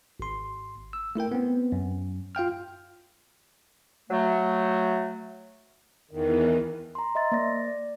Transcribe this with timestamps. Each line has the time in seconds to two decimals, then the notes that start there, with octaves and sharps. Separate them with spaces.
0.19 G#1 C6
0.93 E6
1.15 A3 E4 A#4 G5
1.32 B3 C4
1.72 F#2
2.35 F4 F5 G5 F6
4.10 F#3 A3
6.11 E2 D#3 E3
6.95 A#5 C6
7.15 D#5 E5 C6 A6
7.32 A#3 C5 D5 A6 A#6
7.67 D5